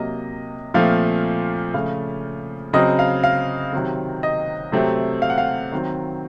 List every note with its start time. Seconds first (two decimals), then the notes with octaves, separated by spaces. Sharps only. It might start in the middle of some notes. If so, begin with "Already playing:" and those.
Already playing: C3 F#3 A#3 D#5
0.74 A#2 F3 A3 C4 F5
1.74 C#3 F3 A3 F5
2.73 C#3 F#3 C4 D#5
2.99 F5
3.23 F5
3.73 C3 D#3 F#3 C4
4.23 D#5
4.72 C3 F#3 A3 C4
5.22 F5
5.30 F#5
5.38 F5
5.72 D#3 F#3 C4